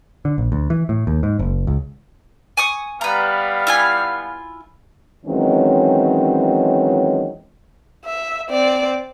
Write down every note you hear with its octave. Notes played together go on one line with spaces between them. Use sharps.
D3
A#1
D2
E3
A2
D#2
G#2
F#1
C#2
G#5 C#6 D#6
G3 B3 B4 F5 A#5
E4 F4 G#5
D#3 E3 F#3 G#3 C4 C#4
E5
C4 D5